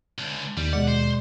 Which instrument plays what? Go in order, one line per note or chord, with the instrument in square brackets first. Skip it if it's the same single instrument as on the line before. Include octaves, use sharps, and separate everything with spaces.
[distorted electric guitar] C#2 D3
[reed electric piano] D#2 [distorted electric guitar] G3
[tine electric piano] B2 G#3 D5 [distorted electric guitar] F#5
[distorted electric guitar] C5